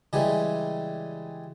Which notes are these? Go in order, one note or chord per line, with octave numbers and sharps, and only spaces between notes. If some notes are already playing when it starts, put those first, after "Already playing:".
C#3 E3 G3 G#3